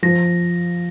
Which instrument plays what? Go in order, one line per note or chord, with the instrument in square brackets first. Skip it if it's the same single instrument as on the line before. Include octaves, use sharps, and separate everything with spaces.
[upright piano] F3 [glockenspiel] A#6